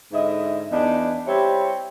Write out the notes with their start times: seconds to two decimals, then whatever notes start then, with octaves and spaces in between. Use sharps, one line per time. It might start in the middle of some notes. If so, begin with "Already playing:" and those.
0.13 G#2 D3 E4 D#5 E5
0.72 E2 D4 D#4
1.27 G3 C4 E4 C#5